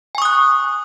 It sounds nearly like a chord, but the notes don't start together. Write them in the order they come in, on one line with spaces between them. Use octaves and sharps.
G#5 C#6 D#6 F#6